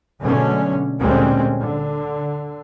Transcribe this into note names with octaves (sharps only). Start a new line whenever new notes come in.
B2 D3 F#3 G#3 A3 C#4
D2 A#2 G3 G#3 C4 C#4
D3